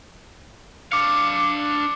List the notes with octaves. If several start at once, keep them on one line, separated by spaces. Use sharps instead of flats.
D4 F5 D6 C#7